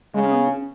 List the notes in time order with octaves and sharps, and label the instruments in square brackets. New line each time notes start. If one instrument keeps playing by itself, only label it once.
[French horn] C#3 [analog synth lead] G#3
[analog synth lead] C#4
B3
C#4